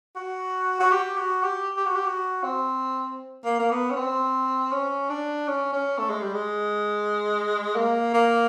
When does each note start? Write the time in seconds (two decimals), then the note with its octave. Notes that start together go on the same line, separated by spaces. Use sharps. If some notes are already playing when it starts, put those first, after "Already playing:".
0.16 F#4
0.80 F#4
0.92 G4
1.17 F#4
1.43 G4
1.77 G4
1.86 F#4
1.95 G4
2.06 F#4
2.44 C4
3.45 A#3
3.59 A#3
3.71 B3
3.90 C#4
3.96 C4
4.72 C#4
5.10 D4
5.48 C#4
5.73 C#4
5.98 A3
6.10 G#3
6.22 G3
6.34 G#3
7.76 A#3
8.14 A#3